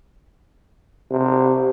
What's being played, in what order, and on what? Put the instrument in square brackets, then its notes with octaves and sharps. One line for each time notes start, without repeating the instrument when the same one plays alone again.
[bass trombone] C3